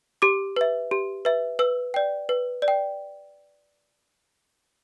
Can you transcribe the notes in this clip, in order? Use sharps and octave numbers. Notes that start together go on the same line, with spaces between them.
G4 D6
B4 E5
G4
B4 E5
B4 E6
D5 G5
B4
D5
G5